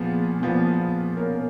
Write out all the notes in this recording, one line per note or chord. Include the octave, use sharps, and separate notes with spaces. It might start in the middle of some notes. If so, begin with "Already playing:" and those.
Already playing: A#2 F3 B3 G#4
A#2 F3 B3
B2 A#3 C#4 A#4